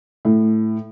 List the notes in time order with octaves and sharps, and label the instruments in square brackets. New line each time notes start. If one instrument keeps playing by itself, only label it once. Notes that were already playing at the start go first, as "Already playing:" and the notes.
[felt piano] A2